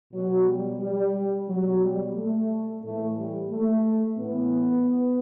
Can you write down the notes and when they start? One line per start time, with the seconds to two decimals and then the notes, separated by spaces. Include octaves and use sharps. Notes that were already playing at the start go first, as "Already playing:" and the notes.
0.13 B2 F#3
0.47 G3
0.80 G3
1.47 B2 F#3
1.82 G3
2.15 A3
2.82 A2 E3 A3
3.17 G3
3.50 A3
4.17 A2 E3 B3